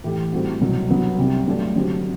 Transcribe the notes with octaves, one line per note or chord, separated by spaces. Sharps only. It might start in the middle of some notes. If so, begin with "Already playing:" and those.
A2 E3 A3 E4 G4
A2 G3 C4 F#4
C2 B2 F#3
G2 F#3 B3
C2 C3 G3
G2 F#3 A3 D4
D3 F#3 C4 G4